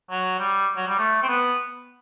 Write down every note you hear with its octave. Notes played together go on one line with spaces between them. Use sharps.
F#3
G3
F#3
G3
A3
C4
B3